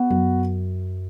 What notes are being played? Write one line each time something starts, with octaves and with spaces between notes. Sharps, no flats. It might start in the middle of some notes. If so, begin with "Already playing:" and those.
Already playing: B3 F#4
F#2